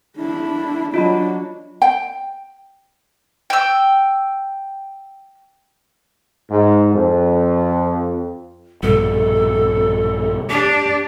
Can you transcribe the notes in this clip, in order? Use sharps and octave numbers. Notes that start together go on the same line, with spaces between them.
D4 E4
F#3 D4 F4 D#5 B5
G5
G5 E6
G#2
F2
A#1 G2 B2 A4
D4 G4